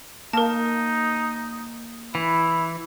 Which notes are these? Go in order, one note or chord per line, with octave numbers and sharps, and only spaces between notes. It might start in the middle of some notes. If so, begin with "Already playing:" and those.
A#3 D#4 A#4 A5
E3 E4